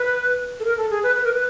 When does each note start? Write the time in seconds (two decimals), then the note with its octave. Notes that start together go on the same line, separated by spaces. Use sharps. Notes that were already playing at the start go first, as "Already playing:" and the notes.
Already playing: B4
0.60 A4
0.65 A#4
0.78 A4
0.90 G#4
1.03 B4
1.15 B4
1.25 A#4
1.33 B4